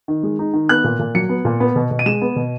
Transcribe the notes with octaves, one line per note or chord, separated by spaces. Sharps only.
D#3
G#3
D#4
D#3
B3 F#6
A#2
A#2
F#3 C#7
B3
A#2
B3
B2
B2
D#7
G#3 E7
B3
B2